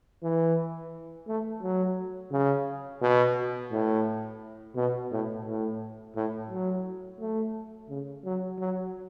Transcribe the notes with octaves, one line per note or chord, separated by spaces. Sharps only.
E3
A3
F#3
C#3
B2
A2
B2
A2
A2
A2
F#3
A3
C#3
F#3
F#3